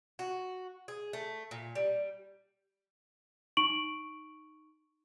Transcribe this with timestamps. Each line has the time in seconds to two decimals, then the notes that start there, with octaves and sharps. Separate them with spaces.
0.19 F#4
0.88 G#4
1.13 A3
1.51 A#2
1.75 G3
3.57 D#4 C#6 D7 F#7